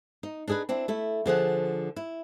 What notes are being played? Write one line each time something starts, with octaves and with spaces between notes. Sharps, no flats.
D#4
D4 D#4 G#4 A4 B4
C4 D4 E4
A3 E4
D3 F3 G#4 F#5
E4